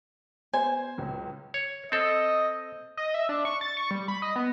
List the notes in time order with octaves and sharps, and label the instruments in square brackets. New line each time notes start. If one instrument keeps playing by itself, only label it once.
[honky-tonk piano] B3 C5 [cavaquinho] G#5
[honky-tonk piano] C#2 F#3
[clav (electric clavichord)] C#5
[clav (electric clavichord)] C4 A4 [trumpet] D#5
[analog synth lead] D#5
E5
D4
C#6
A6
C#6
G3
B5
D#5
B3